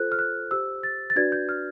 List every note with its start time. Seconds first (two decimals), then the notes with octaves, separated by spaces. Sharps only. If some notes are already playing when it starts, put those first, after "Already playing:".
Already playing: F4 A4 C5 F#6
0.12 F6
0.19 F#6
0.51 G4 C5 E6
0.83 A6
1.10 A6
1.16 D4 F#4 B4 D5 G#6
1.32 G6
1.49 F6